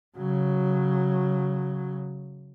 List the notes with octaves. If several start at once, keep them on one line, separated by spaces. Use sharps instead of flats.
C#3 F#3